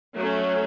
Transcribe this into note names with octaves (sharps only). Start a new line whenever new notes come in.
F#3 A3 C#4